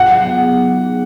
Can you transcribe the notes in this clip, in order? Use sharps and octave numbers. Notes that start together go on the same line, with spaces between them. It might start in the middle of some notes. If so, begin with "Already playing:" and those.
Already playing: G#4 F#5
F#3
B3
G#4
D#4
B3
F#3